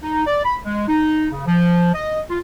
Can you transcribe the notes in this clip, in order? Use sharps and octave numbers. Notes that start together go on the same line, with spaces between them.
D#4
D5
B5
G#3
D#4
C#3
F3
D#5
F4